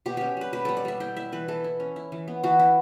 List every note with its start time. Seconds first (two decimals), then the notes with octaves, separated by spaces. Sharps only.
0.06 B2 G4
0.17 C#4 G4
0.37 G3 B4
0.53 B2 B4
0.65 G3 A4
0.77 D5
0.85 G3 E5
1.00 E4 G5
1.17 E4 E5
1.32 E3 B4
1.48 E3 A4
1.64 E4
1.80 C#4
1.96 E4
2.12 E3
2.28 B3
2.43 E3 F#4
2.59 E4